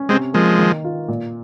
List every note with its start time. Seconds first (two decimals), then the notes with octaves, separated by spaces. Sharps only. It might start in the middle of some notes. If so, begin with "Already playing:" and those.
Already playing: C#4
0.09 C3 G#3 C4
0.34 F3 G#3 A#3
0.59 D#3
0.85 F4
1.08 A#2